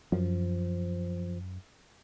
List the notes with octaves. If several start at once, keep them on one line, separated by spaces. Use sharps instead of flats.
F#2 F3